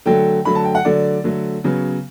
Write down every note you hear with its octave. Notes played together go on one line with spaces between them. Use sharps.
D3 F#3 A3 G5
D3 F#3 A3 B5
A5
G5
F#5
D3 F#3 A3 D5
D3 F#3 A3
C#3 F#3 B3